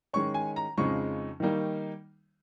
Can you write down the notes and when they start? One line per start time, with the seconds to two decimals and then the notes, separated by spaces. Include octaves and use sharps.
0.13 D#3 G#3 C#4 C#6
0.34 G#5
0.56 A#5
0.77 F2 C#3 F3 G#3 D#4 C#6
1.40 D#3 G3 A#3 D#4